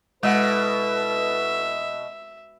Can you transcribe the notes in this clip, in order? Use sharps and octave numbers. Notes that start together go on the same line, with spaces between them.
B2 G#3 E4 A4 B4 D#5 E5 F#5